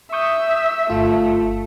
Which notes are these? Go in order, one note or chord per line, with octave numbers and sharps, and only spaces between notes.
E5 C#6 D#6 G6
G1 A3 F4